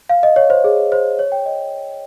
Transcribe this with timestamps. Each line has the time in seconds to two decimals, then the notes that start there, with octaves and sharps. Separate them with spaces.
0.09 F5
0.23 D#5
0.36 C#5
0.50 C5
0.64 G#4
0.92 C5
1.19 C#5
1.32 G5
1.46 D#5